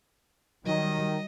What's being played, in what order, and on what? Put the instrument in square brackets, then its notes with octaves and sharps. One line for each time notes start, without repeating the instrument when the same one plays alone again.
[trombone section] D#3 [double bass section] F#3 G3 [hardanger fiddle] D#5